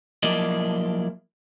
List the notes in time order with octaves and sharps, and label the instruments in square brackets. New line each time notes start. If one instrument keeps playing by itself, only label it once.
[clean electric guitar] F3 F#3 A#3 E4 D5 D#5